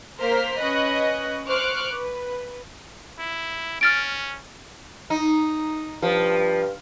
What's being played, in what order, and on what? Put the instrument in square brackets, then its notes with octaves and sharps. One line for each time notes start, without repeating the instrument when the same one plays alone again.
[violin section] A#3 A#4 C5 C6 F6 B6
C#4 B4 D#5 C#6 F#6
C5 C#6 D6 F6 F#6
B4
[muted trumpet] E4
[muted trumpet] C#4 [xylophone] F6 A6 D7
[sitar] D#4
[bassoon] G2 [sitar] F3